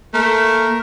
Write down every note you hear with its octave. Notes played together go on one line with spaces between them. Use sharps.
A3 A#3 A#4